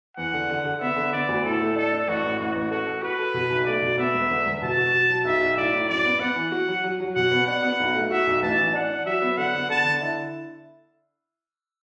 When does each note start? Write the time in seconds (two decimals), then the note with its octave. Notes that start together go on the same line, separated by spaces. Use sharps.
0.17 E2 F#5
0.33 D3
0.50 D3
0.65 D3
0.80 B3 E5
0.96 D3
1.12 B3 D5
1.29 D2
1.44 A2 A4
1.60 A3
1.76 D4 A4
1.92 D4
2.08 A1 F#4
2.24 A2
2.40 A1 F#4
2.55 A1
2.71 F#4 A4
2.87 A4
3.02 F#4 B4
3.19 A4
3.34 B2
3.50 B1
3.66 A3 D5
3.82 B2
3.98 B3 E5
4.14 E1
4.30 D3
4.46 E1
4.62 B2 A5
4.77 F#4
4.94 B2
5.10 F#3
5.25 B1 E5
5.41 B1
5.57 A2 D5
5.73 A2
5.89 F#2 D5
6.04 B3
6.20 B3 F#5
6.36 E3
6.52 F#4
6.68 F#3
6.84 F#3
7.00 F#3
7.15 B2 F#5
7.31 B3
7.47 D4 F#5
7.63 B3
7.80 B1
7.95 A3
8.11 F#4 E5
8.27 B1
8.42 A1 A5
8.58 E3
8.74 D4 F#5
8.90 D4
9.06 F#3 E5
9.22 B3
9.37 D3 F#5
9.54 B3
9.69 D3 A5
9.85 D3
10.01 E4